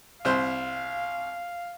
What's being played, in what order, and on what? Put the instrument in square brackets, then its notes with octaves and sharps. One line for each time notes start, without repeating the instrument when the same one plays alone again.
[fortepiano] C2 C5 [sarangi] F5